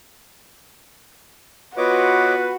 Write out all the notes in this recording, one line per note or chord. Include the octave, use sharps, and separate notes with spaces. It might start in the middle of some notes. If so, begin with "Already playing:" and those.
B3 F4 F#4 B4 C#5 D#5 D6